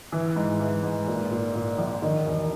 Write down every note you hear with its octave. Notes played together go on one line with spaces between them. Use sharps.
E3
G#2
E3
G#2
A#2
A#2
A#2
A#1
D#3
E1